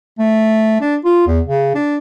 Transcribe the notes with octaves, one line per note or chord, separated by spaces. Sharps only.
A3
D4
F4
E2
C#3
D4